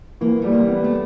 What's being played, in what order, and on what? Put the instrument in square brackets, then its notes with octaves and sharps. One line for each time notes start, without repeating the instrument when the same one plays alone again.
[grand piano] E3 [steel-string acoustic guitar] A#3
[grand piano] G3 [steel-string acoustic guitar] A3
[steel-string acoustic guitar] A#3
[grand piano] B3
[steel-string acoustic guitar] A3